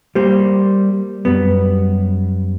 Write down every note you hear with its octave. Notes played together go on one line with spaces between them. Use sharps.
G3 A#3 C5
F#2 G3 B3